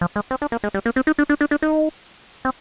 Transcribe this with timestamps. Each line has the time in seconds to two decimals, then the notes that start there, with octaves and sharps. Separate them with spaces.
0.01 F3
0.16 G#3
0.31 C4
0.42 D4
0.52 A#3
0.64 G#3
0.74 G3
0.86 A#3
0.96 C4
1.07 D#4
1.19 D4
1.29 D4
1.41 D4
1.51 D4
1.62 D#4
2.45 C4